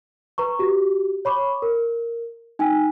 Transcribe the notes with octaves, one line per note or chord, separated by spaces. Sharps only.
B4 A#5 C#6
F#4 G4
C#5 B5 C#6 D6
A#4
D#4 G5 G#5